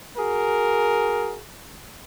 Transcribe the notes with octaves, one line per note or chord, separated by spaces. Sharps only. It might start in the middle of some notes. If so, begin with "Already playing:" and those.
F#4 G#4 A#4